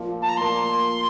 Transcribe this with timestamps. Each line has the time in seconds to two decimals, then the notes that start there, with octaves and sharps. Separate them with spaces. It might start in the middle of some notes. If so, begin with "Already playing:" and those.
Already playing: A#2 F3 A#3
0.22 A5
0.29 A#5
0.37 A#2 F3 A#3 C6